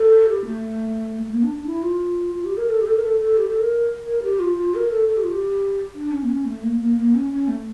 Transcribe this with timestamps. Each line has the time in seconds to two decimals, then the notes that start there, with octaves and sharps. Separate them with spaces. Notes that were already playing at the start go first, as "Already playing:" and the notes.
Already playing: A4
0.28 G4
0.45 A3
1.22 A3
1.31 A#3
1.43 D4
1.54 D4
1.66 E4
1.82 F4
2.34 F4
2.45 G4
2.57 A#4
2.68 A4
2.80 G4
2.85 A4
2.96 A#4
3.03 A4
3.19 A4
3.37 G4
3.48 A4
3.59 A#4
4.05 A#4
4.22 G4
4.39 F4
4.57 F4
4.74 A#4
4.91 A4
5.07 A4
5.16 G4
5.23 F4
5.30 G4
5.94 D4
6.11 C#4
6.22 A#3
6.28 C#4
6.44 A3
6.62 A#3
6.79 A#3
6.96 A#3
7.14 C#4
7.30 C#4
7.47 A3